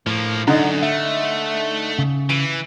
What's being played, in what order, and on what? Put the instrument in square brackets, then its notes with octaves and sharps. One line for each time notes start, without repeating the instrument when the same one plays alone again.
[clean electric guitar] A2 [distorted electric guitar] F3 A#3
[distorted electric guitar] F#2 [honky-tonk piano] D3 D#4 [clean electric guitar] D5 F#5 A#5
[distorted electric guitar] A3 [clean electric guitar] E5
[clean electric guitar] C#3
[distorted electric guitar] E3 [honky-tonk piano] D7 D#7